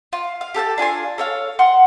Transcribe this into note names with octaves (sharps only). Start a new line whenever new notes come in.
F4
F5
G4 A4 G5 A5
D4 F4 G#5 C6
A4 C#5 F5
F#5 C6 F6